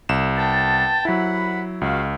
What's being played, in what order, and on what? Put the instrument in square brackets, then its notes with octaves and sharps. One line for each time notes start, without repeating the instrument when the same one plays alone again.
[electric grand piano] C2 E7
[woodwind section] B3 G5 A5
[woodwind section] C2 F#5 B5 [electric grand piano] F#3 E4
[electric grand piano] C#2 [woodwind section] F#4 F5